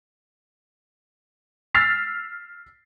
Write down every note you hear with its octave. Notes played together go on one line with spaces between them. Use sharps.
E6 F6 A6 B6 C7 F7